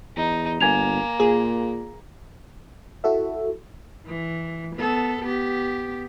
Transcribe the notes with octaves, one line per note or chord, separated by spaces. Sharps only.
E2 D#4
G1 A#3 G#5 G#6 F7
A#2 G#4
E4 F#4 A4 E5
E3
B3 A4
B3 G4